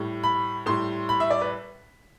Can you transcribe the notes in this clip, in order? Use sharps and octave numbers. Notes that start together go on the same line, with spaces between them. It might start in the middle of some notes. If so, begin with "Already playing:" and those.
Already playing: A2 G3
B5
A2 G3 C6
B5
E5
D5
B4